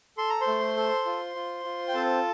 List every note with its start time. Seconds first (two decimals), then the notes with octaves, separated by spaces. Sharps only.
0.18 A4 C6
0.30 A#5
0.41 C5 C6
0.47 A3
0.77 A4
1.06 F4
1.36 F4
1.64 F4
1.88 G5
1.94 C4 A4 A5